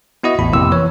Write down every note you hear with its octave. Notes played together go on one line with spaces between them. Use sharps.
B3 E4 F#4 D#5
A1 E2 A2 B5
F2 C3 A#3 E4 E6
E3 C#5